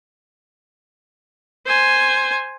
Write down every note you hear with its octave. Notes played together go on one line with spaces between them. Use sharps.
C5 G#5